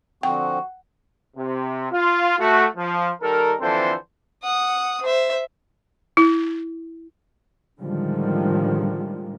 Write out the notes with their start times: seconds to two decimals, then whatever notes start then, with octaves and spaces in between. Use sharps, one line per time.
0.23 D3 F3 C4 F#4 F#5 G5
1.37 C3
1.92 F4
2.39 A3 F#4
2.76 F3
3.21 D#3 G3 A4 A#4
3.60 D3 E3 F3 C4 A4 C5
4.43 F#5 D#6
5.02 C5 E5
6.17 E4
7.81 A2 D3 D#3 F3 G3 G#3